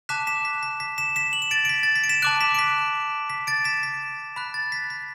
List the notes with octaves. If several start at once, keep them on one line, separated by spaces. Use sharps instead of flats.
A5 D6 F#6 B6 E7
B6 E7
B6
B6
B6
B6 E7
B6 E7
F#7
E7
A6 D7
D7
B6
A6
B6
D7
B6 E7
A5 D6 F#6 D7 F#7
B6 E7
D7
B6
B6
A6 D7
B6 E7
B6
B5 F#6 B6
A6
B6
B6